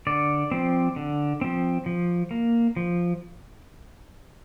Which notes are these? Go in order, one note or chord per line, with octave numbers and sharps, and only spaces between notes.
D3 D5
F3 C4
D3
F3 C4
F3
A#3
F3